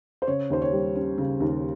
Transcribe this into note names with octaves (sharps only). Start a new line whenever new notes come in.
C5
C#3 C#5
D#2 C5
C#5
G3
C#4
C#3
D#2